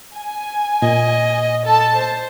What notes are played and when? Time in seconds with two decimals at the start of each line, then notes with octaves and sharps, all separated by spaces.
0.16 G#5
0.82 A#2 D#5
1.67 A4 A5
1.97 C5